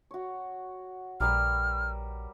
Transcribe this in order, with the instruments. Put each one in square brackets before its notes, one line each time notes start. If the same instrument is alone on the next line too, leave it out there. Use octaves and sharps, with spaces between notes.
[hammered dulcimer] F#4 C#5
[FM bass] A#1 [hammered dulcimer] G3 A#4 B4 [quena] F6